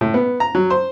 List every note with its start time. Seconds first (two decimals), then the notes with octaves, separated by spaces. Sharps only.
0.01 A2
0.14 B3
0.40 A#5
0.55 F#3
0.70 C5